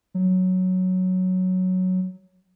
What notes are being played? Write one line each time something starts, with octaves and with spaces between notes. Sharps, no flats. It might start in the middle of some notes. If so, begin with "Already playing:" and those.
F#3